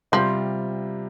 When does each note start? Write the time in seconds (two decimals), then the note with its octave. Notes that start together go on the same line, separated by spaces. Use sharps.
0.12 C3 F3 G3 F4